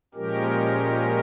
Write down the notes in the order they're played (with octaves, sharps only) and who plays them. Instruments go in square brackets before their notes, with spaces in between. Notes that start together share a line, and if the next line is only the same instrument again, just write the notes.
[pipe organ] A#2 F3 G#3 C#4 G4 A#4